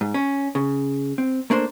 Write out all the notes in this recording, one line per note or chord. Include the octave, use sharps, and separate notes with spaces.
G#2
C#4
C#3
C4
A3 A#3 D4 C5